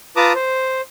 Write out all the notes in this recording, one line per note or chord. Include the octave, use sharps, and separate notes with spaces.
F4 B4 A5 A#5 D6 D#6
C5